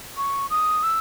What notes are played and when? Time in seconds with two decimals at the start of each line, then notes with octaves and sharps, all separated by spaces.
0.17 C#6
0.50 D#6
0.83 E6